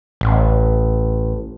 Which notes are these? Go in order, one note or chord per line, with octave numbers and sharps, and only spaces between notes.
A1